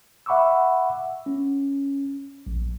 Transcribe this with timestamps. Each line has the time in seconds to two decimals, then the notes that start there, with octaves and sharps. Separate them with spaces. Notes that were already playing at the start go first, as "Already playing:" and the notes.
0.26 E5 F#5 B5 C#6 D6 E6
1.26 C#4
2.47 A#1